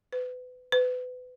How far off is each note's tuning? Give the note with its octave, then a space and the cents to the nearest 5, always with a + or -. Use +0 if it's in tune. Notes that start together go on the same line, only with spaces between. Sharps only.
B4 +30
B4 +30